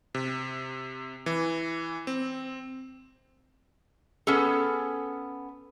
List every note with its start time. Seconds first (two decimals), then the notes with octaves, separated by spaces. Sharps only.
0.15 C3
1.26 E3
2.07 C4
4.27 B3 C#4 G#4 A4